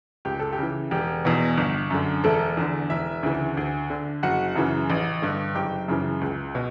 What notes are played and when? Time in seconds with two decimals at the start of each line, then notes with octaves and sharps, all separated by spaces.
0.25 C#2 G4
0.40 A4
0.53 G4
0.58 C#3 E3
0.91 E1 G4
1.25 E2 B2
1.57 G1
1.91 F#2 D3
2.24 E1 A3 A4
2.57 E2 D3
2.90 E1 E4 E5
3.23 D2 C#3 E3
3.57 D2
3.90 D3
4.23 F#1 F#4 F#5
4.56 F#2 C#3 E3
4.90 A1
5.22 G2 D3
5.55 F#1 G4 G5
5.88 F#2 C#3 E3
6.21 C#2
6.55 B2